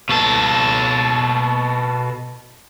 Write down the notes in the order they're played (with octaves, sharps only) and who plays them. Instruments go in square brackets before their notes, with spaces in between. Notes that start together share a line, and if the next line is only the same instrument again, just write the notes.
[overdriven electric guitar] B2 A4